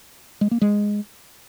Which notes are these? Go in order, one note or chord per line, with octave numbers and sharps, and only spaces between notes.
G#3
A#3
G#3